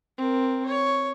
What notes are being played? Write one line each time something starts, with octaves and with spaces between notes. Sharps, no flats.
C4 A#4
C#5